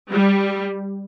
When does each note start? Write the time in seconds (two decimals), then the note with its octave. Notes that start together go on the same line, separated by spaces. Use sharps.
0.11 G3